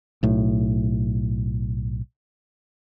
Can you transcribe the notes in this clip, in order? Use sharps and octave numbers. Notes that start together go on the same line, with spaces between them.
B1 A2